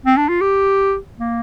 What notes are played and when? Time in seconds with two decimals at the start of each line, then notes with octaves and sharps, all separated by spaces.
0.06 C4
0.17 D4
0.29 F4
0.41 G4
1.19 A#3